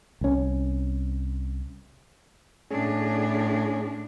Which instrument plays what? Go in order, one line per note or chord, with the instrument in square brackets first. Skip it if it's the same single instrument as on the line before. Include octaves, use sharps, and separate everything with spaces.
[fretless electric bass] C2 C#4
[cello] A2 D4 [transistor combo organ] C#4 G#4